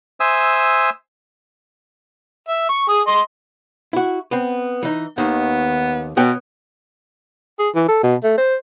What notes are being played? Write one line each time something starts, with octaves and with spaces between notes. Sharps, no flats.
C5 E5 G#5 D#6 E6
E5
C#6
G#4 D#6
D#5 C6
E4 F#4
B3 C4
E3 D#4
D#2 D#3 B3
B2 B3 C#5 G5
G#4
E3
A4
B2
A3
C5